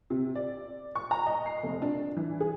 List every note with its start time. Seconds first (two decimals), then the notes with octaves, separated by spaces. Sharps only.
0.10 C3
0.35 D5
0.95 C#6
1.11 A#5
1.26 D#5
1.46 C7
1.63 F1
1.82 D4
2.17 E3
2.40 G#4